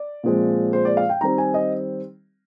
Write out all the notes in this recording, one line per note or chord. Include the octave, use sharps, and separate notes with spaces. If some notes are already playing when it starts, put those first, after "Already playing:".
Already playing: D5
A#2 F3 G#3 C4
C5
D5
F5
G5
D#3 G3 C4 A#5
G#5
D#5